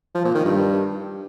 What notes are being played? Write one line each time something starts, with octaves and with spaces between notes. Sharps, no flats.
F3
A#2
D#3
G2